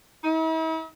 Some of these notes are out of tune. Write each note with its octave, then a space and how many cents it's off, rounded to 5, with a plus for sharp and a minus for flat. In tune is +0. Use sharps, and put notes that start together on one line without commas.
E4 -45